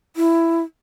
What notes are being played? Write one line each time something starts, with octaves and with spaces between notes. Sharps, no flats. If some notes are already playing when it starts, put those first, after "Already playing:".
E4